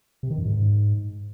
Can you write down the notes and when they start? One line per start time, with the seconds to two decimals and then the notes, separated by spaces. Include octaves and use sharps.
0.23 C3
0.30 D#3
0.38 F#2
0.45 G#2